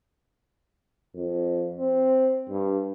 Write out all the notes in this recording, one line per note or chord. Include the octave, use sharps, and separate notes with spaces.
F2
C4
G2